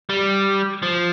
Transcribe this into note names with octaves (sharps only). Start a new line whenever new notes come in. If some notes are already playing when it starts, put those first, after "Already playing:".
G3
F3